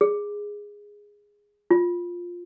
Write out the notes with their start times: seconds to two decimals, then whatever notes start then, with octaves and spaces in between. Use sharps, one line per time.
0.01 G#4
1.71 F4